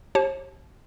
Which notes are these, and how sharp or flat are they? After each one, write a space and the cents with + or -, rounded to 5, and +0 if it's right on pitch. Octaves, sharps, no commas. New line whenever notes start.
G4 -25 C#5 -45 A5 -35